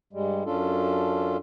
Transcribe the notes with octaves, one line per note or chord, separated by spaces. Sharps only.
G2 G3 G#3
F#2 C#4 D4 F4 A4